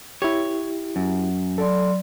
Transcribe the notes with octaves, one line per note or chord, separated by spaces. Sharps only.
E4 G4 C#5
F#2
F#3 A4 D5 C6